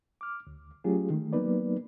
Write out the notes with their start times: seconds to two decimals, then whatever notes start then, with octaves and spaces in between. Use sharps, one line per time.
0.21 D6 F6
0.47 D2
0.84 F#3 A3 C#4 F4 G4 G#4
1.10 D#3 A3
1.33 F#3 A#3 B3 D#4 B4 D5